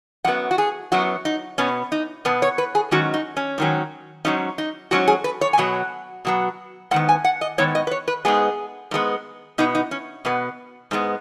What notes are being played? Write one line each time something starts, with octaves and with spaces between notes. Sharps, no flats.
F#2 F#3 B3 F#5
F#4
G#4
F#2 F#3 B3 F#4
D#4
B2 B3 C#4
D#4
B2 B3
C#5
B4
G#4
G#2 D#3 F#3 C#4 F#4
D#4
C#4
G#2 D#3 F#3 C#4
G#2 F#3 C#4 D#4
D#4
G#2 F#3 C#4 F#4
G#4
B4
C#5
G#5
B2 F#3 B3 F#5
B2 F#3 B3
G#2 D#3 B3 F#5
G#5
F#5
D#5
G#2 D#3 B3 C#5
D#5
B4
C#5
B4
G#2 G#3 B3 G#4
G#2 G#3 B3
B2 B3 D#4
D#4
C#4
B2 B3
G#2 G#3 B3